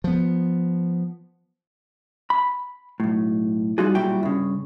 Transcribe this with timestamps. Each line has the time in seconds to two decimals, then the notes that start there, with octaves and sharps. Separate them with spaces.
0.04 F3 B3
2.30 B5
3.00 B1 A2
3.78 G3 D#4 F4 F#4 G#4
3.95 B1 A#2 G3 E4 F#4 G5
4.23 G2 C#3